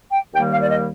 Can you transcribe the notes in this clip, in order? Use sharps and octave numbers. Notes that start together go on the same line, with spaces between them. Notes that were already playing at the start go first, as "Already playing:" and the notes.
G5
D#2 D#3 G3 A#3 G5
F5
D5
D#5